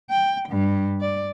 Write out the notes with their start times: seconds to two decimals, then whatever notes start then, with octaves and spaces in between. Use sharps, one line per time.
0.10 G5
0.49 G2
1.01 D5